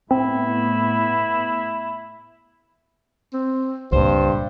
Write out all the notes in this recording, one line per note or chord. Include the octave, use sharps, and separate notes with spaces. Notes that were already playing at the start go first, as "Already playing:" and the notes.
A2 B3 C4 E4
C4
C#2 G2 A#2 C5